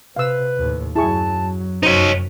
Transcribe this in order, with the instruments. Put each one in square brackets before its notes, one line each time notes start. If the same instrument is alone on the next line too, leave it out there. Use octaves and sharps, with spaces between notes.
[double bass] C3 [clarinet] B4 [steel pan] F5 E6
[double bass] D#2 A2
[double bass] F#2 F#3 [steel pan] E4 G#4 C#6 [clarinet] A5
[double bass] F1 F#2 [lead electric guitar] D#4 C#5 [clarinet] F#4 [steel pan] C5